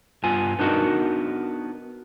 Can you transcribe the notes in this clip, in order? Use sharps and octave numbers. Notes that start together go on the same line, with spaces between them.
G2 B3 F4 G#5
B3 D4 D#4 F#4 A#4